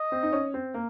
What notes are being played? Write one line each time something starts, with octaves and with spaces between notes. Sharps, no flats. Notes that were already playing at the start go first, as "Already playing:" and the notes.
Already playing: D#5
C4
D#4
C#4
C4
A#3